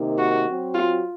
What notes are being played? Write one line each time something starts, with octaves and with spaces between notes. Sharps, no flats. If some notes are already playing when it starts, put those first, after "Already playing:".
Already playing: C3 D#3 A#3 D#4
F#4
F#3 C4 F#4
F4